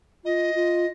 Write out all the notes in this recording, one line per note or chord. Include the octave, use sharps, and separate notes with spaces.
F4 D#5
F4